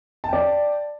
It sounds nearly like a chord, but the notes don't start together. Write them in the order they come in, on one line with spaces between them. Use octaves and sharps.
A5 G5 D5